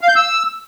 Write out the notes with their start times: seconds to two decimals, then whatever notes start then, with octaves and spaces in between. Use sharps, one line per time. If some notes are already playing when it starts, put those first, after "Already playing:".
0.01 F5
0.09 G6
0.16 E6